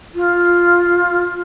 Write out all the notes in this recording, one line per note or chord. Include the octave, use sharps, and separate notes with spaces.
F4